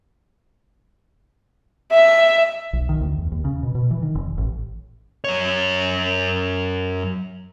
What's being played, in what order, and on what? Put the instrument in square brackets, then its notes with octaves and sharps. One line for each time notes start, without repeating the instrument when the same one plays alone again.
[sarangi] E5
[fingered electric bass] B1
D#3
D2
E2
D#2
C#3
B2
B2
E3
D#3
F1
A1
[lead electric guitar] F#2 C#5